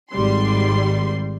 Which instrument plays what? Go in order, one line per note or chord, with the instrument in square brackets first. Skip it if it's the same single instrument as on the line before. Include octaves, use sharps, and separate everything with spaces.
[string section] G#1 G3 C6